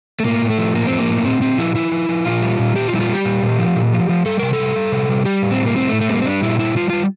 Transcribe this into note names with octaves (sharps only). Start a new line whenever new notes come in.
A3
A2 A#3
A2
A3
F3
A2 A#3
C4
F3
A#3
A2
A#2 C4
A#2 C4
F3 E4
F3 E4
F3
F3
A#2 F4
G3
A#2
A#2 G4
F4
G3 E4
F4
G3 G4
A#2
A#2
F3
A#2
F3
F3
G3 A4
C3 A#4
A4
G3
G3
C3
G3
G3 G4
A2
C4
G3
A#3
A2 C4
A3
A2
A3
G3 A#3 C4
C4
G3 D4
A#2 E4
G3 E4
G3 F4
G3 F4